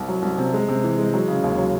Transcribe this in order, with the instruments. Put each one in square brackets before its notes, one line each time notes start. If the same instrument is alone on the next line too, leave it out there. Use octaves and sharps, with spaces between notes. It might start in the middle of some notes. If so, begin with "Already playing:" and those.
Already playing: [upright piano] C2
F#3
C2
C3
G#3
C3
E3
G#3
F#3
C#3
D#2
F#3